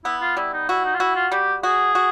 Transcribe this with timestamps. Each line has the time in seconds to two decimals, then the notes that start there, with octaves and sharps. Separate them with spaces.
0.05 B3 E4
0.21 F4
0.37 G3 E4
0.53 D#4
0.69 E4 F#4
0.85 D#4
0.94 F4
1.00 E4 F#4
1.16 F4
1.32 G3 G4
1.63 F#4 G#4
1.95 F#4